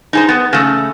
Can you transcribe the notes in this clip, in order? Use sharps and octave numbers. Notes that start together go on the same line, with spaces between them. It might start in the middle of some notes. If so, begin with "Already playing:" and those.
D#4 G#4 C5
B3
C#3 A3